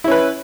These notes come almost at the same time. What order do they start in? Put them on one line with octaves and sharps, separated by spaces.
E4 C#4 B4